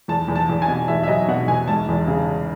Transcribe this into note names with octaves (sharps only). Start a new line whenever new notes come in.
E2 A5
E2
A5
E2
G#5
B2
E2 E5
E5
F#3 D#5
B2 F#5
E2 G#5
E1 A5
E2
C#3